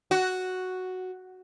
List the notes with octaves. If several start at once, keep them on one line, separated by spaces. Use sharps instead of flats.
F#4